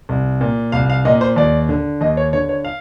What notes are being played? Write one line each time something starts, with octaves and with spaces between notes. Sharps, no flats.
C2
A#2
C2 F5
F5
A#2 D#5
C5
D#2 D5
D3
D#2 D#5
C#5
D3 C#5
C#5
F5